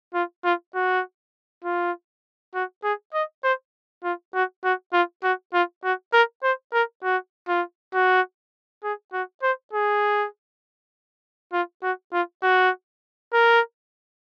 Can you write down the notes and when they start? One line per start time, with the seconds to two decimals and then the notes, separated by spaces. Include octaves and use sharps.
0.14 F4
0.45 F4
0.75 F#4
1.65 F4
2.54 F#4
2.84 G#4
3.14 D#5
3.44 C5
4.04 F4
4.34 F#4
4.64 F#4
4.93 F4
5.24 F#4
5.54 F4
5.84 F#4
6.14 A#4
6.43 C5
6.74 A#4
7.04 F#4
7.48 F4
7.94 F#4
8.84 G#4
9.13 F#4
9.43 C5
9.73 G#4
11.53 F4
11.83 F#4
12.13 F4
12.43 F#4
13.33 A#4